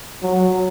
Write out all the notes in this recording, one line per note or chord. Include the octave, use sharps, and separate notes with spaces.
F#3